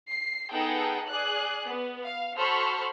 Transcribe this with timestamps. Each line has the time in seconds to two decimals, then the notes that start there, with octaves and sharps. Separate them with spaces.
0.11 C7
0.52 B3 D#4 G#4 A4 F#5 G5
1.08 G#4 D5 F#6
1.65 B3
2.04 F5
2.36 F#4 A4 C5 B5 C#6 F6